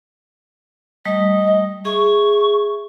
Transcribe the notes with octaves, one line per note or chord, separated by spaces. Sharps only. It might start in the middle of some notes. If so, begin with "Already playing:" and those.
G3 A3 D#5 D#6
G#4 E5 C#6